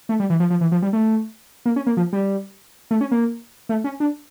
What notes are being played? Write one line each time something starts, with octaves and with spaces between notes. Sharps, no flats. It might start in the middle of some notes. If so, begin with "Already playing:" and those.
A3
G3
E3
F3
F3
E3
F3
G3
A3
A#3
C#4
A#3
F3
G3
A3
C#4
A#3
A3
C#4
D4